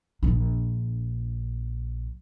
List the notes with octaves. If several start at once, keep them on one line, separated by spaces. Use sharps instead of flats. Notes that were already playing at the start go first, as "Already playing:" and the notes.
A#1 D4